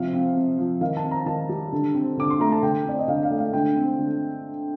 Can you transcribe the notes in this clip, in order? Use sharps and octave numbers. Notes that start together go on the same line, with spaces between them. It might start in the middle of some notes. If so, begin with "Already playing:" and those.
Already playing: C3 F3 F5
C4
C3
F3
D#3 F5
A5
C4
A#5
D#3 A5
G3
D3
C4
D3 D6
C6
A3 A#5
A5
D3 G5
C4 D5
D#5
D3 F5
F5
A3
F5
D3 G5
C4
D3